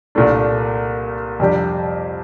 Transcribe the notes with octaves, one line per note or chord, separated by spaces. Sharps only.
C2 A#2 A3 D4
F2 C3 G3 D4 G4